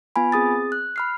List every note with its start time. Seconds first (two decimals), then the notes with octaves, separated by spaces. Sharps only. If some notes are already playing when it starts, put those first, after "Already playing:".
0.16 B3 F4 G#5 B5
0.32 C4 G#4 D#6 A6
0.72 F#6
0.96 B5 F6 C7